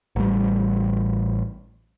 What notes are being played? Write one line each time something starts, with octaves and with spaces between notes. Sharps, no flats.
A1 G3